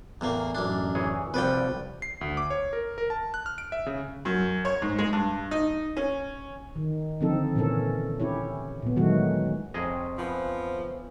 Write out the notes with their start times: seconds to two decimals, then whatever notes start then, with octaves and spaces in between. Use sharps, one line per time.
0.21 E2 A2 A#3
0.55 A1 F#2 D4
0.95 E3 G#4 C#5
1.34 C2 F3 G3 B4 D5 G5
2.02 C7
2.21 D2
2.37 D6
2.50 C#5
2.73 A#4
2.98 A#4
3.10 A5
3.34 F#6
3.46 F6
3.58 D7
3.72 E5
3.86 C#3
4.25 F#2
4.65 C#5
4.82 G#2
4.98 G#3
5.13 G2
5.51 D#4
5.97 C#4
6.76 D#3
7.21 D3 F3 C4 D#4 A4
7.56 A#2 E3 C#4 A4 A#4
8.20 C#4 E4 G4 C#5
8.82 A#2 B3
8.96 D#3 E3 F#3 G#3 A3 F#4
9.74 F2 C3 C#4 F4 G#4 D#5
10.18 E3 F3 B3